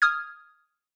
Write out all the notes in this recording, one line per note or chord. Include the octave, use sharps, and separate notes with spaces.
D#6 F6 G#6